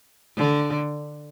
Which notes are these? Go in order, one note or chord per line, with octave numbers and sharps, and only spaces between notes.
D3